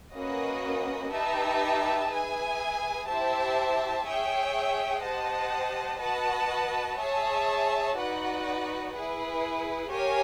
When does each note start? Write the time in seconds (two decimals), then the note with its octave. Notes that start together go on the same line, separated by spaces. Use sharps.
0.15 A#3 C#4 F#4 B4 D#5
1.12 D#4 G4 B4 E5 A5
2.11 G#4 B4 E5 G#5
3.08 E4 G4 C5 E5 A5
4.05 G#4 C#5 E5 G5
5.03 G4 C5 D#5 F#5 A5
6.00 F#4 B4 D#5 F#5 A5
6.99 G#4 C#5 E5 A5
7.96 D#4 F#4 B4 D5 F#5
8.93 E4 G#4 B4
9.91 G4 A#4 C#5 F5 G#5